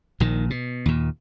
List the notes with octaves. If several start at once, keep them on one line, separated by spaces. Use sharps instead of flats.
A#1 A#2 D#3
B2
D#2 A#2